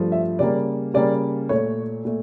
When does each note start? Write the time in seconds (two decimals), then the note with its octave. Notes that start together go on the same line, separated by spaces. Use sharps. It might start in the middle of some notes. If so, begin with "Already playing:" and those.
Already playing: G2 F3 A3
0.12 E5
0.39 C#3 G3 A#3 D5
0.94 C#3 G3 A#3 D5
1.49 A#2 A3 C#5
2.05 A#2 A3